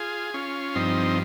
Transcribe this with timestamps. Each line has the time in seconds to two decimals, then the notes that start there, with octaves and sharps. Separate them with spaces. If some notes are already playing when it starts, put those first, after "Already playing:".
Already playing: F4 G#4
0.34 C#4 F4
0.75 G2 F3 C4 D#4